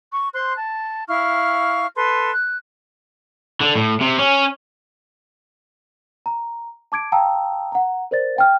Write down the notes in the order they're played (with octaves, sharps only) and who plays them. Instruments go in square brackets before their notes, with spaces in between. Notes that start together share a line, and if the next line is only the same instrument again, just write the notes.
[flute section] C#6
C5 C6 F#6
A5
E4 F5 C#6 F6
A4 B4 C6
F#6
[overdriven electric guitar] D3
A2
C3
C#4
[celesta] A#5
A5 D6 G#6 D7
F5 G5 A5 A#5 D#6 E6
F#5 A#5
A#4 C5 D5 A6
F5 G5 F6